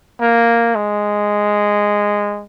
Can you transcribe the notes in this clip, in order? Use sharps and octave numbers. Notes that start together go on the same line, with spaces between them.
A#3
G#3